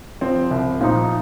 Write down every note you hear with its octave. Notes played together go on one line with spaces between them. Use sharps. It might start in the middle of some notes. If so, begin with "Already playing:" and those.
F3 C4
C2
A#2 F3 D#4